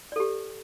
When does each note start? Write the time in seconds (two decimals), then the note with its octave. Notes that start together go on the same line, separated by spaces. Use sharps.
0.12 D5
0.16 A4
0.20 G4